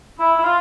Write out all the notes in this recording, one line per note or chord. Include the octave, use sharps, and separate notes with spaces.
E4
E4
F4